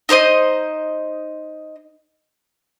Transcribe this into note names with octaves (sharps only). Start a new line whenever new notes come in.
D#4 A4 C5 D#5